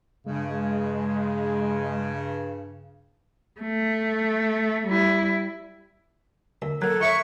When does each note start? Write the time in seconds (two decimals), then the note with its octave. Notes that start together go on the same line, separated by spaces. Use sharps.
0.26 G2 C#3 G#3
3.61 A3
4.87 G3 E4
6.62 D2 A#4
6.82 F#3 A#3 A4 A#5 F#6 G#6
7.01 F4 C#5 E5 C#6